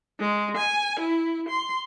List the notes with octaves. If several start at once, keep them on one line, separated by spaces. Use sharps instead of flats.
G#3
G#5
E4
C6